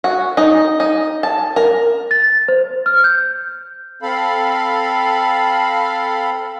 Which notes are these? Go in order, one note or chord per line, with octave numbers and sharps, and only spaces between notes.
F#4
D#4
D#4
A5
A#4
A6
C5
F6
G6
C4 A4 F5 B5